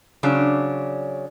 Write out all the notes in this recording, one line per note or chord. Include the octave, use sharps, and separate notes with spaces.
C#3 F#3 D4